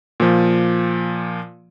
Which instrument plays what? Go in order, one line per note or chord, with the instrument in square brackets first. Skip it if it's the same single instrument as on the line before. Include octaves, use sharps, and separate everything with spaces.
[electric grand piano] A#2 F3